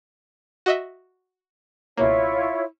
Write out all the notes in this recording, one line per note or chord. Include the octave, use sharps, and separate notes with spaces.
F#4 D#5 E5
C#2 B2 A#3 E4 F4 C#5